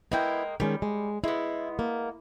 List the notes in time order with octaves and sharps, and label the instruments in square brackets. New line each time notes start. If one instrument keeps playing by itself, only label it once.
[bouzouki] G#3 A#3 G5 [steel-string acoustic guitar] B3 E4
[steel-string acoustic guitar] D#3 G#3 C#4 [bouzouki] G3
[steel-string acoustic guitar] G#3
[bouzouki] G#3 B3 [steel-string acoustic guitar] E4
[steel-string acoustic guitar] A#3